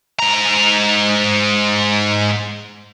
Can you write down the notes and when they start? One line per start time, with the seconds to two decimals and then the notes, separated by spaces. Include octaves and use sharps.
0.20 G#2 A#5